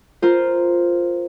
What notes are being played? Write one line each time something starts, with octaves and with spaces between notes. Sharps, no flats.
F4 A#4 C5